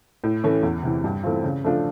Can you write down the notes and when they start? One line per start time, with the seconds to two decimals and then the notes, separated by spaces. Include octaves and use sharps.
0.24 A2
0.44 E3 A3 C#4
0.63 E2
0.83 C3 E3
1.04 G2
1.24 E3 A3 C4 F4
1.44 C#3
1.64 F3 A3 D4 F4